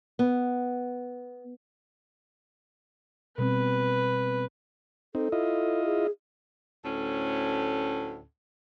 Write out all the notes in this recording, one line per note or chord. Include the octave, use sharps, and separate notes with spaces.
B3
B2 G3 C4 B4
C4 D#4 A4
E4 F4 D#5
G#4
D2 A2 C#4 A4